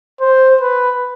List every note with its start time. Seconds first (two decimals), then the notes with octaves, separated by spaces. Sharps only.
0.21 C5
0.61 B4